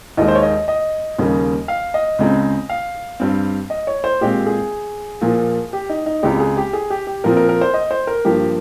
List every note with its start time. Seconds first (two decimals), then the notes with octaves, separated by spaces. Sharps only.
0.17 D#2 D#3 G#3 D#5
0.28 C5
0.35 C#5
0.43 D#5
0.68 D#5
1.19 D#2 C#3 G3 A#3
1.68 F5
1.94 D#5
2.19 C#2 C#3 G#3 C4
2.69 F5
3.20 G2 G3 C4
3.70 D#5
3.87 C#5
4.04 C5
4.21 A#2 G#3 C4 G4
4.46 G#4
5.21 A#2 F3 A#3
5.73 G4
5.89 D#4
6.06 D#4
6.23 C#2 C#3 G#3 C4 G4
6.40 G#4
6.57 G4
6.73 G#4
6.90 G4
7.07 G4
7.24 A#2 F3 C4 A#4
7.37 A#4
7.49 A#4
7.61 C5
7.74 D#5
7.91 C5
8.07 A#4
8.25 G2 F3 A#3 G4